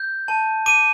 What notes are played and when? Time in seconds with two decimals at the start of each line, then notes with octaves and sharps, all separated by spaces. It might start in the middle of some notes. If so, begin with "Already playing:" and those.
Already playing: G6
0.28 A5
0.66 D6 D#7